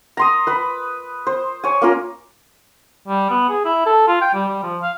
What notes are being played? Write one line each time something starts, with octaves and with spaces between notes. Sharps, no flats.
A#5 C6 D#6
B4 B5
C5
C#5 G#5
A#3 C#4 F4 A#4
G3
B3
G#4
E4
A4
F4
G5
G3
G3
F3
F5